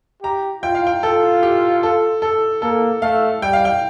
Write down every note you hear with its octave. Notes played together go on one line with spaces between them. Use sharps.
G4 A#5
F4 G5
F5
G5
F4 A4
G4
A4
A4
A#3 A4
A3 F5
G3 G5
F5
G5